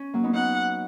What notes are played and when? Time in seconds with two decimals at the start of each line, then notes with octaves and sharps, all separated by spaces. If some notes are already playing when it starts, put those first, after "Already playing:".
Already playing: C#4
0.13 F#3 A#3
0.23 B3 D#4
0.34 B3 D#4 F#5